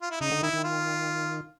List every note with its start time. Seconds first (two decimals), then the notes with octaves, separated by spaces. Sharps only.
0.02 F4
0.11 E4
0.21 C#3 D#4
0.32 D3
0.43 D#3 E4
0.53 D#3
0.64 F4